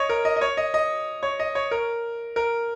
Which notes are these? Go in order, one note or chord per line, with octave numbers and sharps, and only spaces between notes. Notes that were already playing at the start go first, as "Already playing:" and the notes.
Already playing: C#5 D#5
A#4
D#5
D#5
C#5
D#5
D#5
C#5
D#5
C#5
A#4
A#4